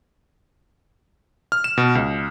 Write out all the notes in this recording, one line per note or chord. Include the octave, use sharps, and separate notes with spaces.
F6
E7
B2
C#2